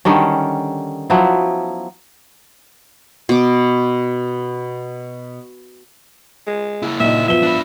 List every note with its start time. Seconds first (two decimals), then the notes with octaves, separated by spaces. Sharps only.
0.05 D3 D#3 G3 C#4
1.10 F3 F#3 B3 E4
3.29 B2 D6
6.47 G#3
6.83 A#3 E4
7.00 A#2 D#4 E5
7.28 F3 B3 E5 G7
7.43 D4 B4